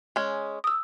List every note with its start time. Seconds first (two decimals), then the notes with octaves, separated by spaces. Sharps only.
0.16 G#3 C#4
0.64 D#6 E6